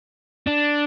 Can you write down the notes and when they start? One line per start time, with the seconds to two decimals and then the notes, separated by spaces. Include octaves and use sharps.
0.47 D4